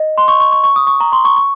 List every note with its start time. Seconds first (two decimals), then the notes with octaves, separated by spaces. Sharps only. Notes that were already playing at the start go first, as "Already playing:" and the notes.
Already playing: D#5
0.18 C6
0.28 C#6
0.40 C#6
0.52 C#6
0.64 C#6
0.76 D#6
0.87 C#6
1.00 A#5
1.12 C6
1.25 C#6
1.37 C#6